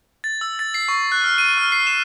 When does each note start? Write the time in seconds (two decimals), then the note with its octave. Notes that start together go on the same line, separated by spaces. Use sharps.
0.24 A6
0.41 E6
0.59 A6
0.74 C7
0.88 C#6
1.12 F#6
1.24 F6
1.38 D#7
1.58 F6
1.72 C7
1.87 E7